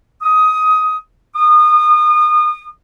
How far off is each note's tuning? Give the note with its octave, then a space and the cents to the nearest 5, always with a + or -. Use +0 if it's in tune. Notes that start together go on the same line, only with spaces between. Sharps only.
D#6 +15
D#6 -30